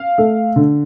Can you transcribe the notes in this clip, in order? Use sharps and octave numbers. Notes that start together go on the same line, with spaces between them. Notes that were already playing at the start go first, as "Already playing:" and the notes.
Already playing: F5
A3
D3